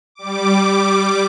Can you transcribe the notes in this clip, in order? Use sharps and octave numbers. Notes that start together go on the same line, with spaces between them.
G3 D6